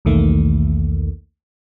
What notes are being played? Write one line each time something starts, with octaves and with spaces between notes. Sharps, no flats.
B1 E2 D#3 A3 A#3